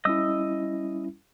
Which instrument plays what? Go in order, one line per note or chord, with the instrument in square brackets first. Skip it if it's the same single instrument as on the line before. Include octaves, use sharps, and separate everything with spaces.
[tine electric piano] G3 C#4 E4 [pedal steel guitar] D#5 D#6 E6